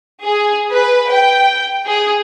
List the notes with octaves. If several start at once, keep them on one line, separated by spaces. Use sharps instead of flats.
G#4
B4
G5
G#4